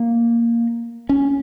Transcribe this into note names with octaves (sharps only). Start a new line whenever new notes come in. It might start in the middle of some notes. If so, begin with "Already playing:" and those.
Already playing: A#3
C#4